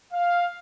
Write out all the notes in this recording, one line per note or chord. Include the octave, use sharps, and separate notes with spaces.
F5